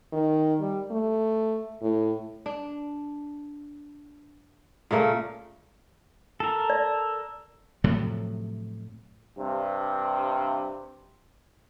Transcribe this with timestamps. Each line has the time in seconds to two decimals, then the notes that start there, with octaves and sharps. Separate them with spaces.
0.13 D#3
0.60 G3
0.91 A3
1.82 A2
2.46 D4
4.91 A#2 C#3 A3 A#3
6.40 A4 A#4
6.70 D5
7.84 A2 C3 F3 F#3
9.37 G2 C3